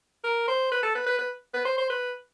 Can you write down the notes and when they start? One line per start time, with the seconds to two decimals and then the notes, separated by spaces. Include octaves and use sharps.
0.24 A#4
0.48 C5
0.71 B4
0.83 A4
0.95 B4
1.06 B4
1.19 B4
1.54 B4
1.65 C5
1.78 C5
1.90 B4